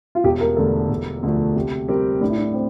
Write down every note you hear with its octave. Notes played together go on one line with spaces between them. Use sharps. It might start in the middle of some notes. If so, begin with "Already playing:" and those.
F4
E1 G4
A#4
E2 D3 A3 A4
E1
D2 D3 F3 A3
C3
G3 C4 G4 A#4
A2 D4
E4
D4
C4